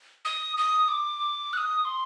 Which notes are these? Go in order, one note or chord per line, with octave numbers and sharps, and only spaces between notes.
D#6
D#6
D6
F#6
D#6
C6